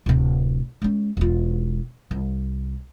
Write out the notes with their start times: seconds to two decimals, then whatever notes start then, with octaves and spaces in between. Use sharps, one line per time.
0.06 D1 C3
0.82 G#3 C#4
1.17 E1 F4
2.11 C2